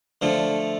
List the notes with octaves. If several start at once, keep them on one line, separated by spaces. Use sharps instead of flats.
D3 F3 A3